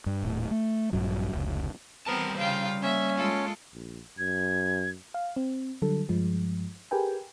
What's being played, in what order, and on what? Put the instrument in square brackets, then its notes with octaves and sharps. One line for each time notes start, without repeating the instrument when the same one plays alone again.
[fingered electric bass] G2
D#1 A2
A3
A#1 G2 F#3
F1 C#2
[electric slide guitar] G3 C5 A5 [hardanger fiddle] B3 [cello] C4 A#4
[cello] C#3 F5 [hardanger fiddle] F4 G5
[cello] A#3 [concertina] C#4 [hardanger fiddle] E5
[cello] G#3 F4 [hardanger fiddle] A4
[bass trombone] A#1
[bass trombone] F#2 [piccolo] G#6
[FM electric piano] F5
C4
D3 F#3 G3 A4
G2 F3 G#3
G4 G#4 A#4 B4 G5 G#5